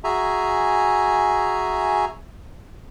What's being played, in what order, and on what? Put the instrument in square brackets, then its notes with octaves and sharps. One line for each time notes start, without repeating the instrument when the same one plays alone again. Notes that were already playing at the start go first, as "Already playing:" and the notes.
[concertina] F#4 G#4 E5 G#5 A#5